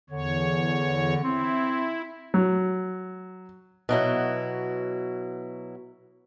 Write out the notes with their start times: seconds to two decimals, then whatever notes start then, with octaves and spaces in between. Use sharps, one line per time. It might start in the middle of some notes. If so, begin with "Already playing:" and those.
0.10 E2 D3 C#5
1.24 C4 E4
2.34 F#3
3.89 B2 F#3 E4